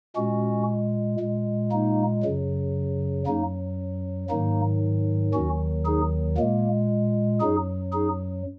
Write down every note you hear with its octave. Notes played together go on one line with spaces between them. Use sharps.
A#2 G#3 C#4 F#4
A#2 G#3
A#3 D#4
F#2 C#3 F#3
F#2 F#3 A#3 D#4
G#2 D#3 F#3 A#3 D#4
D#2 D#3 F#3 C#4 F#4
D#4 G#4
A#2 G#3 A#3
F#2 F#3 D#4 G#4
D#4 G#4